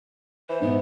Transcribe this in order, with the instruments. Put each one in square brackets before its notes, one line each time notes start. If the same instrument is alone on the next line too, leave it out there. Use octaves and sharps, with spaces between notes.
[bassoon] E3 [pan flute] C5
[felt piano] G#2 [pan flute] B3